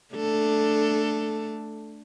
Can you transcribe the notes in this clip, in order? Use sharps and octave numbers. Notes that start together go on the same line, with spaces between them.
A3 D4 A4